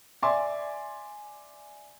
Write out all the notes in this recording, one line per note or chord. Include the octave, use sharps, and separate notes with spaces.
D5 E5 G#5 C6 D6